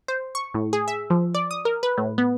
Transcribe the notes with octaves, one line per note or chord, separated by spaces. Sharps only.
C5
C#6
A2
G#4
E5
F3
D5
D#6
A#4
B4
A2
B3